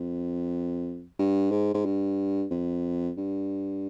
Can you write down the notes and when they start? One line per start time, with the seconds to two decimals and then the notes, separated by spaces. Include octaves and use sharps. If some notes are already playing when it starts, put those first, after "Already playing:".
Already playing: F2
1.19 G2
1.51 G#2
1.74 G#2
1.86 G2
2.51 F2
3.17 G2